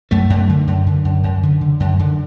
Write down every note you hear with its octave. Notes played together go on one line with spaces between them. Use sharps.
F#2 F#3 A3
F#2
D3
F#2
D3
F#2
F#2
D3
D3
F#2
D3